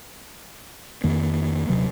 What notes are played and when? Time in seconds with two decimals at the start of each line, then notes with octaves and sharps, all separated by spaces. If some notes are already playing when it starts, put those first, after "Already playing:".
1.04 F2 D#3 A#3
1.69 D#1 C3 F#3